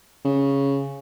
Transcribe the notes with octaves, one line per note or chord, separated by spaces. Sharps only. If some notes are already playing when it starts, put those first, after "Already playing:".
C#3